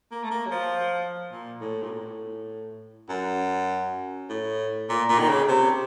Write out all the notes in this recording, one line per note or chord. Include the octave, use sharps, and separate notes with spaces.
A#3
A3
A#3
F#3
F3
A#2
A2
A#2
A2
F#2
A2
A#2
A#2
D#3
C#3
C3